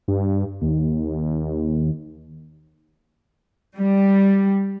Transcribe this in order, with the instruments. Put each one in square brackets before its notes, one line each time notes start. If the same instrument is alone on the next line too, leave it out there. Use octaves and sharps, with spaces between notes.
[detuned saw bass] G2
D#2
[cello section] G3